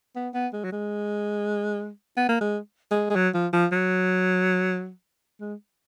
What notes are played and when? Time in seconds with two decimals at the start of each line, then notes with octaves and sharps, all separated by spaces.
0.16 B3
0.34 B3
0.53 G#3
0.64 F#3
0.72 G#3
2.17 B3
2.29 A#3
2.40 G#3
2.91 G#3
3.10 G#3
3.16 F#3
3.34 F3
3.53 F3
3.72 F#3
5.41 G#3